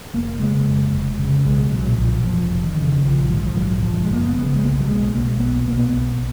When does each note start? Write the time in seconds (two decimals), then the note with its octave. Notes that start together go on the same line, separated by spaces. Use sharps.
0.13 F1 A#3
0.40 C#3 G#3
0.66 F1
0.93 F1
1.19 C#3
1.45 B1 G#3
1.72 A#2 F#3
1.98 B1 F3
2.13 F#3
2.24 F1 F3
2.50 F1
2.64 D#3
2.77 C#3
3.03 A#1 F3
3.30 G#2 F3
3.37 D#3
3.45 F3
3.56 A#1 F#3
3.82 F#1 F3
4.03 G#3
4.09 F#1 A#3
4.22 B3
4.35 C#3
4.54 G#3
4.62 B1 A#3
4.80 F#3
4.87 B2 G#3
5.14 B1 A#3
5.40 B1 B3
5.66 B2 A#3
5.79 B3
5.93 B1